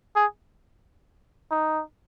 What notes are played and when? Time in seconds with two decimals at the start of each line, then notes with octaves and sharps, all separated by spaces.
0.16 G#4
1.51 D#4